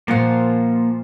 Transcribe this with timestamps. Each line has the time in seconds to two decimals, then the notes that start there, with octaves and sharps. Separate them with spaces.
0.08 A#2 F3 A#3 F4 F#5